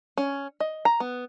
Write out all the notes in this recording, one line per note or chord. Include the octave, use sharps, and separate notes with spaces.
C#4
D#5
A#5
B3